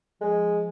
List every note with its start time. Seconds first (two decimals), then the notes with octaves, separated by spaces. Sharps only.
0.21 F3 G#3